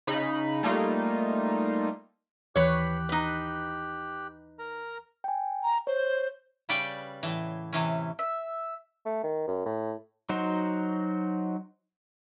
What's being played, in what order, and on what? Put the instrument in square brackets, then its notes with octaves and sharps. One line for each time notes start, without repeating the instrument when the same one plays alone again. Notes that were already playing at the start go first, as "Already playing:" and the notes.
[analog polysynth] C#3 D#4 B5
G3 A3 A#3 D#4 F4
[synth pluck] D#2 E3 [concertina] G4 F#6 [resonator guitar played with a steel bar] B4 C#5
[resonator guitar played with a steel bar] D#4 B4
[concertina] A#4 A#5
[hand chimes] G5 G#5
[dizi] A#5
[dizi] C5 [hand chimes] C#5
[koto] C#3 G3 B4 D5 G5
A2 E3
C3 E3 C#4
[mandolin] E5
[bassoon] A3
D#3
F#2
A2
[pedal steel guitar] F#3 D#4 F#4 C5